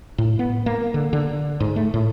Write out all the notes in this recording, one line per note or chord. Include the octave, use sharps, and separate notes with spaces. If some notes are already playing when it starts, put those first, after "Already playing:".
A2
B3
A#3
D3
D3
G#2
A3
A2